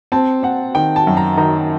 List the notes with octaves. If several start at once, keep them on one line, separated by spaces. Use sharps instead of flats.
C4 A5
C4 F#5
D#3 G5
A5
F#2
A#5
D#3 A#5